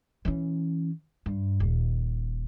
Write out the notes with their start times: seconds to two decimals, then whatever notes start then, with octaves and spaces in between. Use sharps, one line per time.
0.25 E3 C#4
1.26 G2
1.60 D#1